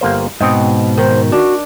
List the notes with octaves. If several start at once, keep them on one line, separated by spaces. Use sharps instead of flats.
G1 A#3 C5
G#2 B2 C4 D#5
D#3 C5
D4 F#4 A#5